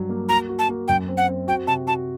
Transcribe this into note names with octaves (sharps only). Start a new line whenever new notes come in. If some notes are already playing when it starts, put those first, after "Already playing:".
Already playing: G2 F#3
A#3
F#4 A#5
F#4
A5
A#3
F#2 G5
C4
F#5
C4
F#4 G5
C3 A5
F#4 A5